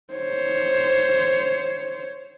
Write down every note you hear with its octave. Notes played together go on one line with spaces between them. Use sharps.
C5 C#5